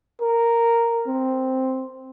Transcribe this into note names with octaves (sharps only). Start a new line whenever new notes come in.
A#4
C4